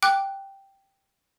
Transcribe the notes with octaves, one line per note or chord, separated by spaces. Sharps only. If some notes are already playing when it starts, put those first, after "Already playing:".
G5 D6 F#6